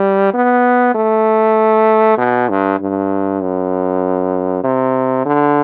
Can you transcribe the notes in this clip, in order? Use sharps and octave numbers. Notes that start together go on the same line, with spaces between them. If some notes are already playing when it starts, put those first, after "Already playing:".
Already playing: G3
B3
A3
B2
G2
G2
F#2
C3
D3